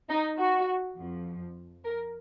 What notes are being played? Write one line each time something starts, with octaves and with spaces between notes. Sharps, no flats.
D#4
F#4
F2 F3
A#4